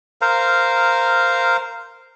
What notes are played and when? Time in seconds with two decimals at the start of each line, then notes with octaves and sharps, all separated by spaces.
0.21 A#4 C5 F5 A#5